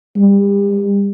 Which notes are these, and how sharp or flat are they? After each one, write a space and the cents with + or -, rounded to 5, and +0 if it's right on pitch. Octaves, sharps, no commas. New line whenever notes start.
G3 +35